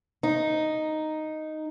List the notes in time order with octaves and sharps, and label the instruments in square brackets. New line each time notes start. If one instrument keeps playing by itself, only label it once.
[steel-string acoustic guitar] D#4